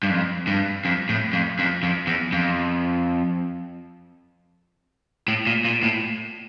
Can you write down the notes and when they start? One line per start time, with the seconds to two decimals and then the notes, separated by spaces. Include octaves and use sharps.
0.03 G2
0.10 F2
0.47 G2
0.85 F2
1.09 A2
1.33 F2
1.59 F2
1.83 F2
2.07 E2
2.32 F2
5.28 A2
5.47 A#2
5.65 A#2
5.83 A2